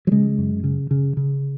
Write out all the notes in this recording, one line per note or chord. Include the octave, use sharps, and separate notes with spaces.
F#3
C#3 G#3
F#2
C#3
C#3
C#3